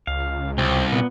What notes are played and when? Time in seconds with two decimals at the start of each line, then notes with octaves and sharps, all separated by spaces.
0.07 C#2 F5
0.58 C2 C4
0.92 A#2 B3